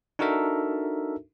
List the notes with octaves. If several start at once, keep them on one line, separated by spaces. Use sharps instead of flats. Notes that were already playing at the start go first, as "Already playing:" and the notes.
D4 D#4 F#4 A4 A#4 E5